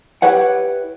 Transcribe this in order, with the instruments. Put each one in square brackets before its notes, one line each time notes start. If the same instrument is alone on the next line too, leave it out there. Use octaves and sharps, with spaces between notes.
[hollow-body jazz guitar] E4 G4 B4 C#5 F#5